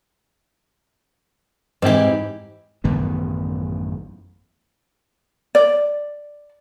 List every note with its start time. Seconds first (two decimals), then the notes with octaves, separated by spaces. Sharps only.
1.82 G#2 E3 C4 E4 G4
2.84 A1 F#2 D#3 B3
5.55 D5